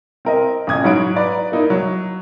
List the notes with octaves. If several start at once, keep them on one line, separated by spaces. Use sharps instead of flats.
C4 A#4 D#5
A1 A#2 D#6 G#6
G#2 F#3 B5 D#6 D7
B4 D5 A#5
A#3 D#4 E4
F#3